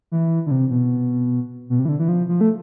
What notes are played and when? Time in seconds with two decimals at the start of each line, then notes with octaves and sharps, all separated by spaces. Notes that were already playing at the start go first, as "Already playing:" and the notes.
0.12 E3
0.46 D3
0.51 C3
0.70 B2
1.70 B2
1.79 C3
1.85 E3
1.89 D3
1.99 E3
2.09 F3
2.29 F3
2.41 A3